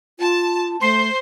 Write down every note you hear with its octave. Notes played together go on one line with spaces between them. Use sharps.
F4 A5
A3 C5 C6